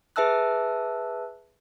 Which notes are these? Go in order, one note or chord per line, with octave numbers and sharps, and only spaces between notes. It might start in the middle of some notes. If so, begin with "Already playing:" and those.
G#4 B4 E5 A5 E6 F#6